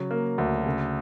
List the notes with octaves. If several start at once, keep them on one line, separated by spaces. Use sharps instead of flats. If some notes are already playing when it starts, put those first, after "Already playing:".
Already playing: C#3 F#3
A#3
D2
C#3